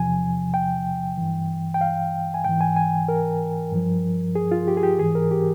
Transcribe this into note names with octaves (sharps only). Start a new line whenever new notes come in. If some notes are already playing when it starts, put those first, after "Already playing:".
Already playing: E2 C3 F3 G#5
G5
G2 E3
G5
F5
G#5
G#2 E3 G5
G#5
G#5
A#4
G2 F3
G#4
F4
G4
G#4
G4
G#2 E3 G#4
A#4
G4